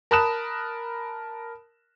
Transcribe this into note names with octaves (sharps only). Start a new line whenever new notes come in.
A#4 A5 B5 D#6 F#6 E7